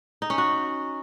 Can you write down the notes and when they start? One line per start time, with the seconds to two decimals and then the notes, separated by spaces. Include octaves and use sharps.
0.22 D#4
0.30 C#4
0.38 F#4